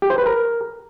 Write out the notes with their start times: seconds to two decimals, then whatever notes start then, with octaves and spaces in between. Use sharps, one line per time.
0.02 G4
0.10 C5
0.18 B4
0.26 A#4